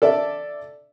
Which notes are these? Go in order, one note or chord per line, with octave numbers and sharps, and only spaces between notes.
A4 D5 E5